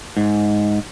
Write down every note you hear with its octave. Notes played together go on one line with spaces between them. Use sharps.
G#2